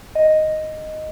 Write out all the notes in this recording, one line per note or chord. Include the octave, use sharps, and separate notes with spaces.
D#5